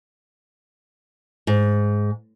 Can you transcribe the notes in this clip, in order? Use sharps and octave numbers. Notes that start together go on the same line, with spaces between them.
G#2